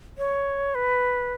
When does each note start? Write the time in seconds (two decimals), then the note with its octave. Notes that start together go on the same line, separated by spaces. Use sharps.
0.18 C#5
0.75 B4